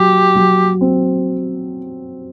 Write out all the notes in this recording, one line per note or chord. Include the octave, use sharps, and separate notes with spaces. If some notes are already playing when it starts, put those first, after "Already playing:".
Already playing: F#3 G4
F#3
C4